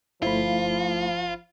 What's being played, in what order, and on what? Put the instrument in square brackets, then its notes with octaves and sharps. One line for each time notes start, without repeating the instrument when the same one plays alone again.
[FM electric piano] G1 C5 B5 [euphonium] F3 [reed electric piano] A3 E4 [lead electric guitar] F4